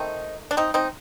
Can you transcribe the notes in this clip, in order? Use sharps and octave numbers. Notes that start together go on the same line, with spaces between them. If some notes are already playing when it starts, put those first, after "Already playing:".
Already playing: D#3 A3 C4 D#4
D4
C4 D#4
C4 D#4